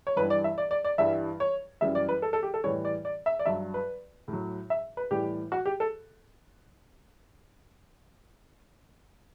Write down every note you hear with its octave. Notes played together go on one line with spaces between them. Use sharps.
C#5
G2 E3 G3 B4
D5
E5
D5
D5
D5
G2 E3 G3 E5
C#5
F#2 E3 G3 E5
D5
B4
A4
A4
G4
A4
A2 E3 G3 C#5
D5
D5
E5
D5
G2 F#3 E5
B4
A2
F#3
E5
B4
A2 E3 G3 G4
F#4
G4
A4